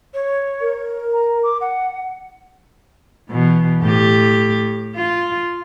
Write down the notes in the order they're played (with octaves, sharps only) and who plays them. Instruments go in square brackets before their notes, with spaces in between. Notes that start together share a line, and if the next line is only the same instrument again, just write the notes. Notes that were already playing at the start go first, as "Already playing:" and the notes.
[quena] C#5
[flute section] A#4
[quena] A#5
D6
F#5
[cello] B2 E3
A2 G4
F4